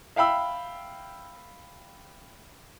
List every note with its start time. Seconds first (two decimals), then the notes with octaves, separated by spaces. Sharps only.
0.16 E5 F5 G5 B5 E6